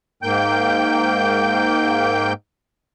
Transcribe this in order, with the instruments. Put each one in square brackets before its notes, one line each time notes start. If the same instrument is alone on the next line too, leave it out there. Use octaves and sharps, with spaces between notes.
[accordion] G#2 A#3 G5 G6